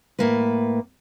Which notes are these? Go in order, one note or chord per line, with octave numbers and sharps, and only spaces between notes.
A2 A#3 B4